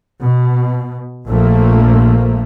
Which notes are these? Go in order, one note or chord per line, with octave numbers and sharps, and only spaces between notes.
B2
A#1 F3 A3 A#3